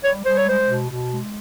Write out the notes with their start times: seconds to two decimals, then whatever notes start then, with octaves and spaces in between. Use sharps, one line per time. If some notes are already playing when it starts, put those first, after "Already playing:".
0.03 G3 C#5
0.25 G3 C5
0.36 C#5
0.46 G#3 C5
0.69 B2
0.90 B2
1.12 G#3